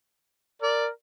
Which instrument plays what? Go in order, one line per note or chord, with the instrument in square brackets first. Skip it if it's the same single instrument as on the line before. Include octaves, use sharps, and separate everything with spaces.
[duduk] A#4 [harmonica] D5